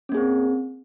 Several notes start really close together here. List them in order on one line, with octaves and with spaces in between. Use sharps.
C#4 A#3 G#4 C4